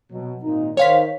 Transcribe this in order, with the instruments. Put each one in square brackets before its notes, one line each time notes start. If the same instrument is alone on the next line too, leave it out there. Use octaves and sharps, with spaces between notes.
[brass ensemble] B2 F#3
G#1 A#2 D#4
[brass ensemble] D#3 C5 [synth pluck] C#5 F5 B6